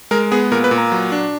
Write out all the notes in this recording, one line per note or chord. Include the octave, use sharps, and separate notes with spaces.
G#3 A#4
B3 G#4
A#2 A#4
B4
A#2
A#5
F#3
D4